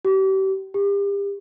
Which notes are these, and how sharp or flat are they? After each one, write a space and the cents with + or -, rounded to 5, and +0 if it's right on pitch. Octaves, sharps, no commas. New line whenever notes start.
G4 -35
G4 +35